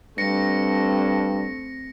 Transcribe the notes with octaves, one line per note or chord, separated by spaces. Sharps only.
G2 A3 C4 A#6 C#7